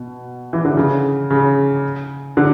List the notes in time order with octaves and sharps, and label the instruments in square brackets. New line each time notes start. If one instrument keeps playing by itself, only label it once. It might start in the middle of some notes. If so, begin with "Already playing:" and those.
Already playing: [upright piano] B2
E3
D3
C#3
C#3
D3